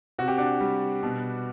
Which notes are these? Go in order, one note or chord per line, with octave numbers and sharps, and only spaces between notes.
C3 F#4
G4
D4 F#4
G3
B2